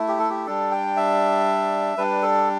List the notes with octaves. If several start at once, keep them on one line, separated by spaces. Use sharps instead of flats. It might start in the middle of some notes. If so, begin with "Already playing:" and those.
Already playing: A3 E4
G4
A4
G4
G3 D4 A4
G5
E5
G3 D4 B4
A4